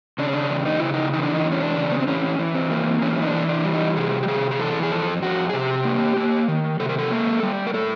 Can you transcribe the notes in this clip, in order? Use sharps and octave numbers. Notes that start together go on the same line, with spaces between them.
C#3 D4
C#4
D4
E2
D#4
C#3 E4
D#4
E3 D#4
D4
D#4
E2
C#4
D4
C#3
B3
C4
E3 C#4
E3
C4
A#3
E3 C#4
D#4
D4
E3
D4
G3
D#4
C3 G#4
G4
C3 G#4
G#4
E3 A4
G#4
F2 A4
F2 F#4
G#4
C3 G4
A#3
A#3
D#3
C3 A4
A#4
A4
A#3
G3
A#4
A2 A4